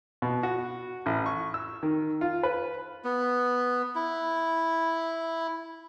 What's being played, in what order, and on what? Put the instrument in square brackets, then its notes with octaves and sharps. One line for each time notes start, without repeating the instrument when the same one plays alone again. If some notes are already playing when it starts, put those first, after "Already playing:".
[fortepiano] B2
F#4
A1
C#6
E6
D#3
F4
B4
[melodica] B3
E4